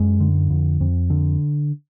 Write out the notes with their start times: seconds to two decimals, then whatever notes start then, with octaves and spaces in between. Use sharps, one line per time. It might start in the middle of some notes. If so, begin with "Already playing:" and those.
Already playing: F#2 G#3
0.20 D3
0.50 F2
0.81 F2
1.10 D3